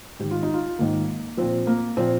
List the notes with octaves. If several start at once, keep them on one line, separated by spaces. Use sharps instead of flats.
G#2 D#3 G4
F4
D#4
F4
G#2 D#3 A#3
A#2 F3 C4
A#3
A#2 F3 C4